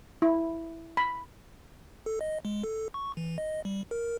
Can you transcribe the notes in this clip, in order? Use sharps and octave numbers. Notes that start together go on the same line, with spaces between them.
E4
B5
A4
D#5
G#3
A4
C#6
E3
D#5
G3
A#4